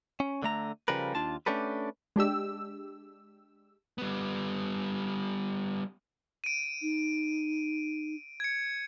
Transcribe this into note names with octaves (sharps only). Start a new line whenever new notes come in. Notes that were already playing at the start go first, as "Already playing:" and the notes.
C#4
D3 A3 A#5
C#3 F3 G3 A#4 B4
D#2 D4 F4 A5
A3 C#4 D4 G4 A4 B4
G#3 D4 G4 E6
G3 B3
D7 D#7
D#4
G#6 C#7